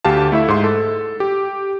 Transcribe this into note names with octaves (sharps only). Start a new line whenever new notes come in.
D2 G4 F5 A5
A3 E4 E5
G#2 C6
A4
G4